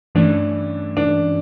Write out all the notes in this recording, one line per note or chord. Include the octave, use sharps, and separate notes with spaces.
G2 E3 A3 C#4 D4
D4